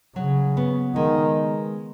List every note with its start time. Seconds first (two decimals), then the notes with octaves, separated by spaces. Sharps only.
0.16 C#3 F#3
0.57 B3
0.95 D#3 G#3